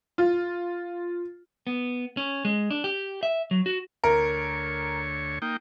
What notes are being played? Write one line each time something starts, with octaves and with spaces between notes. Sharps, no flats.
F4
B3
C#4
G#3
D4
G4
E5
F#3
F#4
D2 A#4 C#5
A#3 D#4 G5